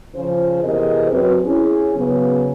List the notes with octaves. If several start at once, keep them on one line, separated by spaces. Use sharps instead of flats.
C#3 F3 F4 G#4 C5
E2 C3 G#4 A#4 C5 D#5
F#2 F#3 C4 B4
C#4 E4 G#4
C#3 F#3 B3